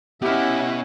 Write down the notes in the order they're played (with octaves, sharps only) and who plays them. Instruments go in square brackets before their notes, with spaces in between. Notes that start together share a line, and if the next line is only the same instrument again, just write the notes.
[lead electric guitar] B3 D#5 [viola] C#4 E4 [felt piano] G4 F6 [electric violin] E5 F#5